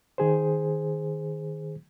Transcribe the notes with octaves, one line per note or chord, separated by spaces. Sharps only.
D#3 G#4 C5